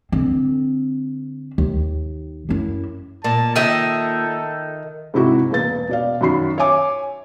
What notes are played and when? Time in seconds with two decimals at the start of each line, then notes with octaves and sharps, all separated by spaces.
0.12 D3 C4
1.58 D#2
2.49 F#2 E4
3.24 A#2 A5
3.56 D#3 A4 D#5 E5
5.14 G#2 C3 E4 F#4
5.51 E1 A#3 B4 A6
5.89 B2 D5 F5
6.21 F#2 D#3 F#4 B5 C7
6.58 C#5 E5 G#5 D6